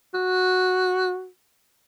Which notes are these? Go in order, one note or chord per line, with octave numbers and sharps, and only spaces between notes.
F#4